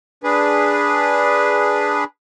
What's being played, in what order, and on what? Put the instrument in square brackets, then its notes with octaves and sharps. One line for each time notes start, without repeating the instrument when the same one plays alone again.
[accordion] D4 G#4 B4